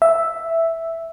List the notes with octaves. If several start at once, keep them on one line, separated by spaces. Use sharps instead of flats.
E5